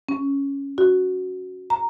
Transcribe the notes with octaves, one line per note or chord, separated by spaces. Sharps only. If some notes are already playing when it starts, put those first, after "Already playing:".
C#4
F#4
A#5